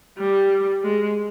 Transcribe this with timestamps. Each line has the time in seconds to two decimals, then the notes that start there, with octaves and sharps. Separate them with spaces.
0.18 G3
0.83 G#3